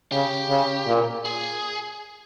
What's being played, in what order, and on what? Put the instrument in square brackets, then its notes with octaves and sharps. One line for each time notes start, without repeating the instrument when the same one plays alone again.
[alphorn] C#3 [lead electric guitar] G4
[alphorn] C#3
A#2
[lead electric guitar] G#4